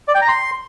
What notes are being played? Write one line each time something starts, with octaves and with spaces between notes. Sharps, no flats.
D5
G5
A#5
C6